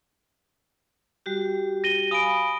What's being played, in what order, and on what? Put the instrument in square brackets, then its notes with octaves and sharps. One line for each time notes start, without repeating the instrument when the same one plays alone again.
[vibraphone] G3 F#4 G4
[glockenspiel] A#6 D#7 G7
[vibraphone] F5 G#5 B5 [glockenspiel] D#6 D7